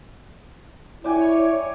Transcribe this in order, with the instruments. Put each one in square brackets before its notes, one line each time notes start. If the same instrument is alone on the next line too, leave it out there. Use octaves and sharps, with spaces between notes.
[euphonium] E4 [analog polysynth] C#5 [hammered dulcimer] D5 G5 G#5